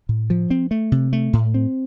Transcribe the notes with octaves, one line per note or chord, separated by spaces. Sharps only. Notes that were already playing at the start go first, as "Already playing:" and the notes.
A2
F3
C4
A3
C3
A3
A2
C4